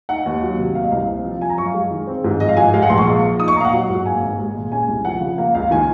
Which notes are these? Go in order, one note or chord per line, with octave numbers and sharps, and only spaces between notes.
D#4 F#5
D#2
F#3
C3
A#3 F5
D#5
C2 F5
C4
F3
F4 G#5
A#5
F#2 C#6
F5
G#3
D#3
C4
G#2
F3 D#5
F5
G#2 G#5
G#3 F5
F#5
A#1 C6
C#6
A#3
F3
D#4 D#6
C#6
A#2 F5 A#5
F#5
F#3
G#2
A#3 G#5
G#1
G#3
A#2
C#4 G#5
C2
F3 F#5
C#3
A#3 F5
C#2 F5
D#3 G#5